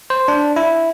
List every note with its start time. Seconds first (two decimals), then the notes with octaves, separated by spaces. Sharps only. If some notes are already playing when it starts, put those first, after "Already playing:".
0.10 C5
0.28 D4
0.56 E4